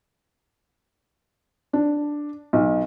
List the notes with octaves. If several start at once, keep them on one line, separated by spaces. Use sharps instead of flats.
D4
B1